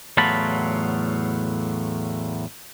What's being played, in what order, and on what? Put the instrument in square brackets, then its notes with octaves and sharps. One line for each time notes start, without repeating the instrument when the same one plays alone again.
[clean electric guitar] E2 A2 F#3 F4 A5 B5